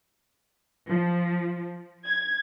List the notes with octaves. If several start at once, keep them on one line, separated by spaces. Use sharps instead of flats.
F3
G#6